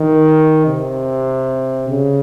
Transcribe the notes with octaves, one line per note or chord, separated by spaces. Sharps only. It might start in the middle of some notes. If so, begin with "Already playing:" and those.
Already playing: D#3
C3
C#3